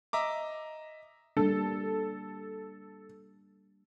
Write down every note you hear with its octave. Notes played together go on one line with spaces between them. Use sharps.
D#5 E5 A#5 D6
G3 A#3 D4 A4